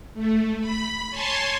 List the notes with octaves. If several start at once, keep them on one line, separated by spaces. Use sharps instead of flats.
A3
B5
C#5 G#5 A5 C6